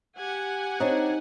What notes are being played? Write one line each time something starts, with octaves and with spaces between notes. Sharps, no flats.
G4 F#5 G#5
C4 D4 D#4 C#5